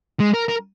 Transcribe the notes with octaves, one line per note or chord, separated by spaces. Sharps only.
G#3
A#4
A#4